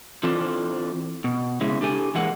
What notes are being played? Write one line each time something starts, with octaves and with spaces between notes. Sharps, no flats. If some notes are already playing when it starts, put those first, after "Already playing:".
E3 C4 D4 F4 A4
B2
C#3 G#3 E4
D4 G4 A4 G#5
E3 G#3 A#3 F#5